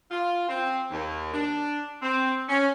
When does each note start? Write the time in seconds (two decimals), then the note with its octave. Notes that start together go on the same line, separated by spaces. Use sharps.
0.11 F4
0.49 C4
0.90 D#2
1.33 D4
2.02 C4
2.49 C#4